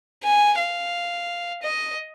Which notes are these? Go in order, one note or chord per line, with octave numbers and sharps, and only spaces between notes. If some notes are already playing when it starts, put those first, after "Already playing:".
G#5
F5
D#5